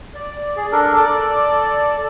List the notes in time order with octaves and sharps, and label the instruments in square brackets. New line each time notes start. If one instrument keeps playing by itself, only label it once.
[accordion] D5
[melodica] G#4
D4 A4 A#4
[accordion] A4 D5 [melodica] D6